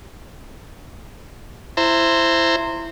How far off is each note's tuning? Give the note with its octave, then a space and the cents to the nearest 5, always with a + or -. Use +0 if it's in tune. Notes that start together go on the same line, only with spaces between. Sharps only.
E4 +15 C5 +0 A#5 -25